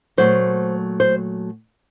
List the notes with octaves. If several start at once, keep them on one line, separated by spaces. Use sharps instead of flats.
A#2 F#3 A3 C5
C5